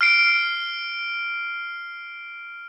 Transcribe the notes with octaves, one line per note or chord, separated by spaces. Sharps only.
F6 C7 D7